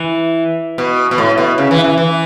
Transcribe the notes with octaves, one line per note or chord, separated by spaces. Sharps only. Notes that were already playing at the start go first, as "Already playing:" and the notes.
Already playing: E3
B2
B2
A2
B2
C#3
E3
E3
E3